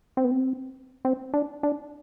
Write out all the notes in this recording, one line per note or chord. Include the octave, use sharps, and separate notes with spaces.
C4
B3
C4
C4
D4
D4